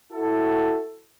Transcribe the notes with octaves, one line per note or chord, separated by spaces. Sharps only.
E4 F#4 A4